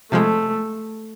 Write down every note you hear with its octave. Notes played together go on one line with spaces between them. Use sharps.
C3 F3 G#3 A3